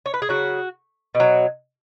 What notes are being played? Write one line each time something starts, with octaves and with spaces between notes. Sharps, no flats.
C#5
B4
G#4
C#3 F#3 F#4
B2
F#3